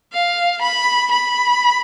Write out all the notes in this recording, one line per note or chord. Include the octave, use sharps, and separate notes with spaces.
F5
B5
B5